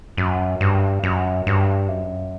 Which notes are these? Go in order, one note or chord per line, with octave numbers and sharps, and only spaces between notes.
F#2
G2
F#2
G2
F#2